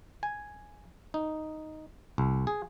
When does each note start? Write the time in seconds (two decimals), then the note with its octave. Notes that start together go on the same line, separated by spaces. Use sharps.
0.23 G#5
1.14 D#4
2.18 C2
2.47 G#4